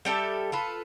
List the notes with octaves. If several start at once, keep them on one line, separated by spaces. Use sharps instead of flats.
G3 G4 A4 E5
F4 A4 B4